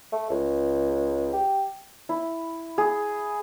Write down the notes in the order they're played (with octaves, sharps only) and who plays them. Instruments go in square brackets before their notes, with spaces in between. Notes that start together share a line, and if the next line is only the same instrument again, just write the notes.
[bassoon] A3
C#2
G4
[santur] E4
G#4